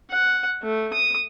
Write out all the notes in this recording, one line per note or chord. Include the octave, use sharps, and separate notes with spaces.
F#5
A3
D#6